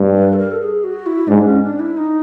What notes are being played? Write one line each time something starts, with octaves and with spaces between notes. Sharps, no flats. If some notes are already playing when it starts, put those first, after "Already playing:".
Already playing: G2
B4
A4
A#4
A4
G#4
F#4
E4
G#2 D4
C#4
D4
E4
D#4